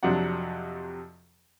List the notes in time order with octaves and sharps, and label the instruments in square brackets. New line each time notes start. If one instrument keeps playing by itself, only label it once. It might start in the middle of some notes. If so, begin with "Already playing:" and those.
[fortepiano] F2 C3 F#3 D4 F#5